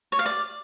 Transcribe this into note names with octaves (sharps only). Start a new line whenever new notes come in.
C#5
F5
D5